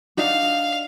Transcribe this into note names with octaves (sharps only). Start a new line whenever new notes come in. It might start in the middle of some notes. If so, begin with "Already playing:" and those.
D4 D#4 F#4 F5